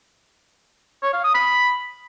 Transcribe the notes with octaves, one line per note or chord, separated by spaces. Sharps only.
C#5
F5
D#6
B5